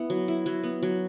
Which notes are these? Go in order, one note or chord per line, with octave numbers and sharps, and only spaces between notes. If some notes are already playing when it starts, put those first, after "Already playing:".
Already playing: B3 E4
F#3
E4
F#3
B3
F#3